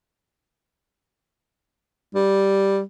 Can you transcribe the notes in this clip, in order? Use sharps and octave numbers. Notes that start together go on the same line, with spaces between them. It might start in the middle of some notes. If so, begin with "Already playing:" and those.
G3